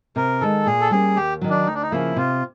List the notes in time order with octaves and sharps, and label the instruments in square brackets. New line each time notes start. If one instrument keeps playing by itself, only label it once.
[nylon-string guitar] C3 [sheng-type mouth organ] A#4
[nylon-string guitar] D#3 G#3 [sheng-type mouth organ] A4
[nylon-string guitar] A#2 [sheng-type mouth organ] G#4
[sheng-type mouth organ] A4
[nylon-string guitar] G3 A#3 C#4 [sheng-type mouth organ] G#4
[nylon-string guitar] D#2 [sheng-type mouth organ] G4
[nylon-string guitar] D#3 F#3
[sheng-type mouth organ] D4
[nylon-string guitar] D2 [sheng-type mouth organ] D#4
[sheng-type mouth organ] D4
D#4
[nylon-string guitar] C#3 F3 A#3 [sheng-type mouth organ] E4
[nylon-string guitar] C3 [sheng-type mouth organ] F4